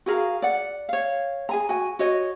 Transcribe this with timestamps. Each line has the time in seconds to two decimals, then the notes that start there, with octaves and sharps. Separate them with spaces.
0.06 F#4 G#4 A#4 F5
0.42 D5 F#5
0.89 C#5 F5
1.49 G#4 G#5 A#5
1.69 F#4 G#5
1.99 F#4 C#5 D#5